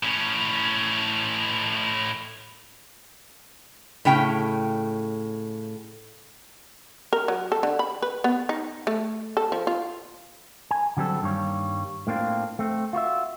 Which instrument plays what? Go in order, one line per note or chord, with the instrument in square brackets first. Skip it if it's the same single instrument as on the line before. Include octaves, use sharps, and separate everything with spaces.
[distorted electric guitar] A2 C#4
[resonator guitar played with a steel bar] A2 C#3 G5
[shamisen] A#4
F#3
A4
D3
B5
B4
B3
D#4
A3
A4
F3
F4
[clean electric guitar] G#5
D3 F#3 G3 C4 A4
G2 D#3 G3 A#3 C#5
A2 A#3 C4 D4 F4
A3 C4
F4 F#4 C5 E5